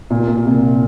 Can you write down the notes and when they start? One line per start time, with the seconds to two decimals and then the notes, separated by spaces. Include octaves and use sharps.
0.10 A#2
0.28 A#2
0.45 C2